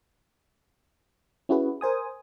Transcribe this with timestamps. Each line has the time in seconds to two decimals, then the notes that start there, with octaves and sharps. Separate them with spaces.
1.49 C#4 E4 F#4 G#4 B4
1.81 A#4 C5 G#5 D#6